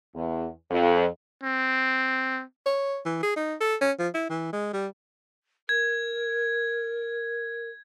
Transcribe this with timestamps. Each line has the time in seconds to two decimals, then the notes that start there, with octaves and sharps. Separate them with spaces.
0.14 E2
0.71 F2
1.43 C4
2.66 C#5
3.06 E3
3.23 G#4
3.36 D#4
3.60 A4
3.81 C#4
3.99 F3
4.14 E4
4.29 E3
4.53 G#3
4.73 G3
5.69 A#4 G#6